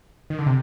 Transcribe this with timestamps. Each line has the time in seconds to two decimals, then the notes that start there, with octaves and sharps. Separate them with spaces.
0.30 D#3
0.39 D3
0.46 C3